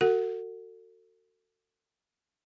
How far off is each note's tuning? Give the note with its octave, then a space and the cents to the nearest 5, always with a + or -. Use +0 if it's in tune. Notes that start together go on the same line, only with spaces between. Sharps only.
F#4 +0 A4 +35 F#5 +0